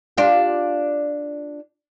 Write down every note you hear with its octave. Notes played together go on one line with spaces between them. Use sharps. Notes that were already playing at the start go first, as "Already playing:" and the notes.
D4 F4 G4